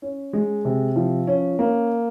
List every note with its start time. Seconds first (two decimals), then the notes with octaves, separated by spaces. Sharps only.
0.02 C#4
0.33 G#3
0.65 C3
0.96 F3
1.27 C#4
1.59 A#3